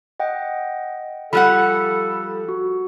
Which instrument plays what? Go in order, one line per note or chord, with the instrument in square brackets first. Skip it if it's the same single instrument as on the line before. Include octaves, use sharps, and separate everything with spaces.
[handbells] D#5 F#5 G5
[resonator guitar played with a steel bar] F3 G3 F#5 [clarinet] A4 [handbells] B5 F#6
[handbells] F#4